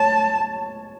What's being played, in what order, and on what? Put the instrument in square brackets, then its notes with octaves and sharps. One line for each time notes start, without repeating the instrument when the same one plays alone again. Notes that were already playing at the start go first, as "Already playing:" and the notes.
Already playing: [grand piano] C#5 [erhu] A5